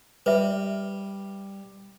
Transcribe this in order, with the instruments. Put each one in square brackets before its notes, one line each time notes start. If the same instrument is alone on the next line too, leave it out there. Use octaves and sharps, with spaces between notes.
[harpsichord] G3 [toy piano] B4 E5